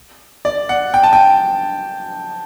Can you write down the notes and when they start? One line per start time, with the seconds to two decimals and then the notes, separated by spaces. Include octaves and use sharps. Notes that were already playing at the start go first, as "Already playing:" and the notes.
0.45 D5
0.69 F#5
0.94 G5
1.03 A5
1.13 G5